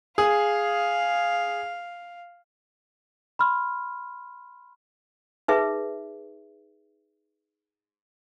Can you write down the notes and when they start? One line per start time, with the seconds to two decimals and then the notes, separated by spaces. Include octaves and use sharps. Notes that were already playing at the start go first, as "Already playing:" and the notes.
0.18 G#4 F5
3.39 B5 C6 F6
5.48 D#4 G#4 B4 E5